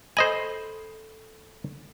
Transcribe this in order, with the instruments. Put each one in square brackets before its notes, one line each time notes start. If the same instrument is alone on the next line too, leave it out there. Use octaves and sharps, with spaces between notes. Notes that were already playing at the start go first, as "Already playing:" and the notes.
[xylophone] A4 B5 [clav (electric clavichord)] C5 D#5 G#5